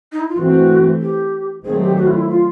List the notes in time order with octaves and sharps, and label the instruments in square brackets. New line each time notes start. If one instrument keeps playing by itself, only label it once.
[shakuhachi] D#4
E4
F4
[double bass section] E3 A3 C4 [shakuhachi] F#4
[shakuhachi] G4
[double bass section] D#3 F#3 A3 C4 [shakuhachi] G#4
[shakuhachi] G4
F#4
E4
F4
E4
F4